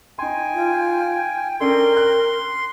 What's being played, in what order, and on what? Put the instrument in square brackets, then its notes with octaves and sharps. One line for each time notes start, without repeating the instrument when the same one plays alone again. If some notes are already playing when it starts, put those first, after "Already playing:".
[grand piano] D#4 C6 [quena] G5 [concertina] G#5
[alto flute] F4
[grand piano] C#4 D4 A4 [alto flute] A#4 [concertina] C6
[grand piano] F#6